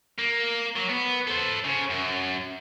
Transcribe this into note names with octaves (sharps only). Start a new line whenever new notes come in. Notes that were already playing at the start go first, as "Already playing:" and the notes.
A#3
F#3
B3
A4 C5
C#3
F#2